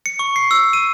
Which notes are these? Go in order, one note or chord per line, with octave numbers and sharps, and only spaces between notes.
C#7
C#6
C7
E6
D#7